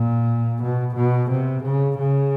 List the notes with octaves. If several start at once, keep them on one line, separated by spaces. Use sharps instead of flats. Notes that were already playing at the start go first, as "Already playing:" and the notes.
Already playing: A#2
B2
B2
C3
C#3
C#3